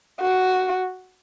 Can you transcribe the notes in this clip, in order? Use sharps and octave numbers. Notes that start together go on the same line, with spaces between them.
F#4